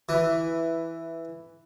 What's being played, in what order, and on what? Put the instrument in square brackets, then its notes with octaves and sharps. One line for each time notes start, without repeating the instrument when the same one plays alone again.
[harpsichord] E3